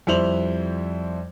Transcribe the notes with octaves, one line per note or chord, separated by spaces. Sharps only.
F2 G3 E4 C5 F7 F#7